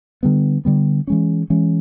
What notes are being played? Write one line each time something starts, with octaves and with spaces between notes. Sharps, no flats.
D3 G3 B3
D3 G3 B3
E3 G#3 C#4
E3 G#3 C#4